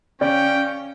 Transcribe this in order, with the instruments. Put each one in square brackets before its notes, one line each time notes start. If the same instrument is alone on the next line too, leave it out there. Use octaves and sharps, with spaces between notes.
[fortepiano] C#3 [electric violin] C#4 [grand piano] D5 [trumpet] G5